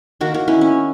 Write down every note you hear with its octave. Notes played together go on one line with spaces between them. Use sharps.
D#3 A#3 F#4 A#4
F#4 A#4
C#4 E4
C#4